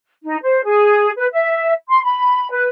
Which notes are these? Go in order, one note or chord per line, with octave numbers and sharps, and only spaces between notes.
D#4
C5
G#4
B4
E5
C6
B5
B4